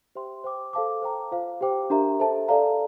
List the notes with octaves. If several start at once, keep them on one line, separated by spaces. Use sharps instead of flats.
G4 C5 E5 G5 C6
C5 G5 D6
A4 C5 F5 A5 D6
C5 G5 A#5 D6
F4 C5 F5
G4 C5 G5 D6
D4 G4 A#4 E5 A#5
A4 C5 E5 A5
A4 D5 F5 A#5